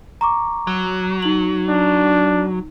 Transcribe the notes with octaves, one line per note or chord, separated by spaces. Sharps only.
A#5 C#6 D6
F#3
D#4 F#7
D4